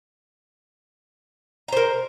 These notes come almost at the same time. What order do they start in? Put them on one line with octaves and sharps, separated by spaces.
A#5 C5 A#4